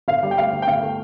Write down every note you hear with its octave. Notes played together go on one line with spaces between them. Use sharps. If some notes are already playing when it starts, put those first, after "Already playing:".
G1 F5
G3
G5
D2 F5
D2
G5
G1 F5
A3